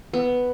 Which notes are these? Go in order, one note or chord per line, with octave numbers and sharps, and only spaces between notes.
B3